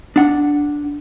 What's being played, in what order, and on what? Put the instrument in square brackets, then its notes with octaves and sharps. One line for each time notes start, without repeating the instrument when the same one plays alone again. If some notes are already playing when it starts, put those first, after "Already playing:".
[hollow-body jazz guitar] D4 F#5